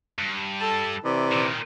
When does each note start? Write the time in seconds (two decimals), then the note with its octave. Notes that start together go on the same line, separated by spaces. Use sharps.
0.18 G2
0.59 A4 A5
1.03 C3 E3 D5
1.32 A#2 D#3